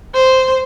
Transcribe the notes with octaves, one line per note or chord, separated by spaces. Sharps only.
C5